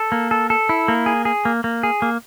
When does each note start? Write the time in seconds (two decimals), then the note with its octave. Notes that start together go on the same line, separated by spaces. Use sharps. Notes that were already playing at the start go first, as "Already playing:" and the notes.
Already playing: A4
0.12 A#3
0.31 A4
0.50 A4
0.69 E4
0.88 A#3
1.06 G#4
1.25 G#4
1.45 A#3
1.64 A#3
1.83 G#4
2.02 A#3